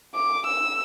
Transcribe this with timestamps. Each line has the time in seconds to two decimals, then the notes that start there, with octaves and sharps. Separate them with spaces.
0.15 D6
0.46 E6